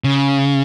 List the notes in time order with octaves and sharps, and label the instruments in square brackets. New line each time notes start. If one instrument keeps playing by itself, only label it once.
[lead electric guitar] C#3